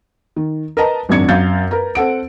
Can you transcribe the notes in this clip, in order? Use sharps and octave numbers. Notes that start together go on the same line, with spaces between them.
D#3
A#4 B4 D#5 A5 A#5
G#1 F#2 D4 G#6 C#7
F#2 F5 G6 A6
A#4 B4 A#5
C4 A4 F#5 D7